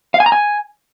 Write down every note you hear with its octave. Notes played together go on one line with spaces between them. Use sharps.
F5
G#5
A#5
G#5